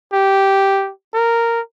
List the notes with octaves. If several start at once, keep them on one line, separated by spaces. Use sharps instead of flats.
G4
A#4